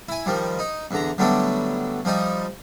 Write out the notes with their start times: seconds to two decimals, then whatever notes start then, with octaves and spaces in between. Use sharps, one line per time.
0.09 E4 G#5
0.26 D#3 F3 G3
0.59 D#4
0.91 E2 D3 A#5
1.18 D3 F#3 G3 A3 B3 D4
2.05 F3 G3 D#4